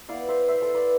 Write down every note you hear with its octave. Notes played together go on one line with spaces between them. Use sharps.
B3 E4 D5 F5
C5 E5
C5 E5
A4 C5
B4 D5